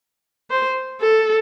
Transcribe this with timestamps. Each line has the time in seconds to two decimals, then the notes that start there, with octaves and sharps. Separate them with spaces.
0.50 C5
1.01 A4